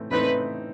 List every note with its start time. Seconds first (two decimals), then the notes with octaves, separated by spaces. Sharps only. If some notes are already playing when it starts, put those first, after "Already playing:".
Already playing: A2 E3 A3 C4
0.11 A2 E3 A3 C4 D#4 B4